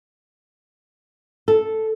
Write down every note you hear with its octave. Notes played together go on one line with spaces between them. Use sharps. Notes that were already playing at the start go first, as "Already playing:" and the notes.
A4